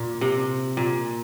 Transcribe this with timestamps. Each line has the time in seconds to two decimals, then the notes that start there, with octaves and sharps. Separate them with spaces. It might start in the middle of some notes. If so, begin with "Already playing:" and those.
Already playing: A#2
0.21 C3
0.77 A#2